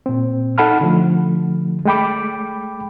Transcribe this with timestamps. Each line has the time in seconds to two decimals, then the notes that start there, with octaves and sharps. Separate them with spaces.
0.06 A#2 C4
0.58 D#4 A4 F#5 A5 B5 F6
0.81 D3 F3 A3
1.85 G#3 A3 G5 B5 D6